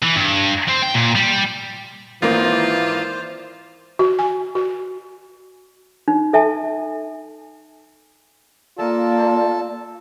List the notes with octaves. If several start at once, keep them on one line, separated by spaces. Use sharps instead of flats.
E3
G2
C4
G5
A#2
G3
G#1 E3 A#3 F4 C5
F#4
G#5
F#4
D#4
A4 E5 G#5 A5
A#3 F4 A4 D5 A5